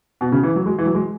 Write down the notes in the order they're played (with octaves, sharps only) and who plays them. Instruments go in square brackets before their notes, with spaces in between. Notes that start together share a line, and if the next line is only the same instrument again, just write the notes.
[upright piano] B2
C#3
E3
F#3
G#3
E3
F#3
G#3